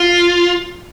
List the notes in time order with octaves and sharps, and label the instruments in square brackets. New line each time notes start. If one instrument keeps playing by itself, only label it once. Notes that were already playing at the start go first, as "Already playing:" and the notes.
Already playing: [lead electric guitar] F4